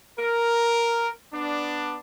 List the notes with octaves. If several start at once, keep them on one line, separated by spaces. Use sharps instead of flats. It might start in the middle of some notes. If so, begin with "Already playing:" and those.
A#4
B3 D4